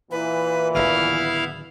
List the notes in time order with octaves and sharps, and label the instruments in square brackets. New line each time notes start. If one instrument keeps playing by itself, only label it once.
[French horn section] A#2 E3 [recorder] B4
[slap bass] D1 C2 D#3 [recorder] B3 [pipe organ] E4 F5 F6